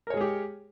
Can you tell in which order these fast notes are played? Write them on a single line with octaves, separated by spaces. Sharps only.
A#4 C#5 G#3 G#4 G4